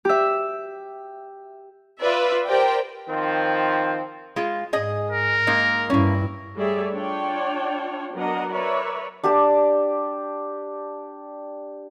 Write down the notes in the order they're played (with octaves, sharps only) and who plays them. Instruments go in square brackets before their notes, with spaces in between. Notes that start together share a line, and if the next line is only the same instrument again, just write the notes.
[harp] G4 E5
[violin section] F4 B4 D5 E5
G4 A#4 C5 D5 G5
[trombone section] D#3 F3 C4
[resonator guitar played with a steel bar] G#3 F4
[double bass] G#2 [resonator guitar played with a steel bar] G#4 D#5
[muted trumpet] A#4
[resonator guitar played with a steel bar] G#3 A#3 D#4
[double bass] G2 E4 [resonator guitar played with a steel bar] A#3 C#4
[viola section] G3 A3 G#4 C#5 D5 E5
D4 F4 C#5 D5 G5
F#3 B3 D4 A#4 D#5 F#5
A#4 B4 C#5 D5 E5
[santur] D4 G4 D5 A5